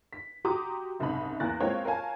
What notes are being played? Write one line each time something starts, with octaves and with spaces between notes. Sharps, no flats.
B6
F#4 G4 A#5 C6 D6 D#6
F#1 C2 G#2 D#5 B5
E2 A#3 A#4 F#6 A6 A#6
G#3 A#3 C4 F4 C#5 G5
A#4 C#5 F5 G#5 A5